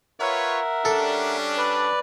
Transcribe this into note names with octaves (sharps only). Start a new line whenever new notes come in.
F4 A#4 B4 C#5 E5 F#5
G3 C#4 D4 A4
B4 D5